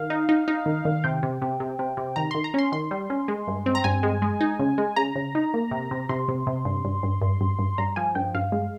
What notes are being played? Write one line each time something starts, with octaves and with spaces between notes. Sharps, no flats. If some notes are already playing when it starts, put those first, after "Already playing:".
Already playing: D#3 F5
D#4
D#4
D#4
D#3
D#3
C3 G5
C3
C3
C3
C3
C3
D#3 A#5
D#3 C6
A#5
C#4 C6
D#3 C6
G3
C#4
G#3
G2
C4
A#5
G2 G#5
G#3
G#3
D#4
C#3
G#3
C#3 A#5
C#3
D#4
A#3
C3
C3
C3 C6
C3
C3
G2
G2
G2
G2
G2
G2
G2 A#5
F3 G#5
G2 G5
G2 F5
G#3